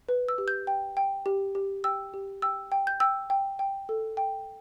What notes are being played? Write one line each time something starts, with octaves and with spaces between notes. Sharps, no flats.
B4
E6
G4
G6
G5
G5
G4
G4
G5 E6
G4
G5 E6
G5
G6
G5 E6
G5
G5
A4
G5